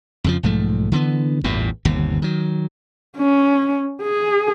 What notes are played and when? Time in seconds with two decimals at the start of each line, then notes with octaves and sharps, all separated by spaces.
0.24 F2 C#3 F3
0.43 B1 G#2 F3 A3
0.92 D3 E3 A#3 B3
1.44 A1 E2 G2 A#2
1.85 G1 D#2 C3
2.22 D#3 F#3
3.18 C#4
4.03 G#4